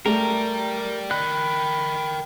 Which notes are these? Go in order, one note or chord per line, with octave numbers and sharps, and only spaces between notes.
A3 G4 A#4 D5
A#4 G5 B5 F#6